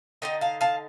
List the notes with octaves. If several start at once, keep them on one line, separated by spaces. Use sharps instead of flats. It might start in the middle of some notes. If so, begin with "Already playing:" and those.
D3 A3 D#4 D#5 G5
F5 A5
F5 A5